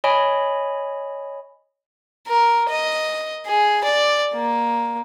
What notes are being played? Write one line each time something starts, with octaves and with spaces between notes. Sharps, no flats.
C#5 D#5 G#5 B5
A#4
D#5
G#4
D5
A#3